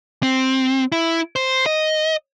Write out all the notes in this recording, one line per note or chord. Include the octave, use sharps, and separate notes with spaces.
C4
E4
C5
D#5